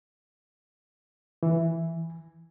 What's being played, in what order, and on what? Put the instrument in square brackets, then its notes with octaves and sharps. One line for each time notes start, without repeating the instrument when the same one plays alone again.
[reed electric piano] E3